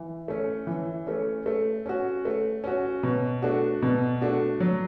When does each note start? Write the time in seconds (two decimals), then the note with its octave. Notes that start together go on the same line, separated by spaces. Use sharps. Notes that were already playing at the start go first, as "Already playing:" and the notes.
Already playing: E3
0.28 A3 C#4
0.67 E3
1.07 A3 C#4
1.46 A3
1.86 C#4 F#4
2.25 A3
2.64 C#4 F#4
3.03 B2
3.42 A3 D4 F#4
3.82 B2
4.21 A3 D4 F#4
4.60 F#3